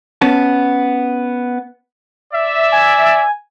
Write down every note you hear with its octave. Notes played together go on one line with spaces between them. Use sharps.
B3 C#4 A5
D5 E5
G#5